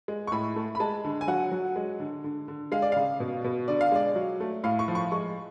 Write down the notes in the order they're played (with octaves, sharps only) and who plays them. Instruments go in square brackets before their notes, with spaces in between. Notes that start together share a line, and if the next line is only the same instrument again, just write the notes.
[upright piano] G#3
C#6
A2 B5
A3
B5
G#3 A5
D3
G#5
F#3 F#5
F#3
G#3
D3
D3
D3
G#3 F5
D5
C#3 F5
B2
B2
D3 D5
F5
G#3 D5
F#3
A3
A2 F5
C#6
F3
C#6
G#3 C#6